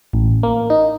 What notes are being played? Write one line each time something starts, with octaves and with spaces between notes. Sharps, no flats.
A1
A#3
D#4